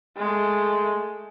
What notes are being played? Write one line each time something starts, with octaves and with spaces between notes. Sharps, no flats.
G#3 A3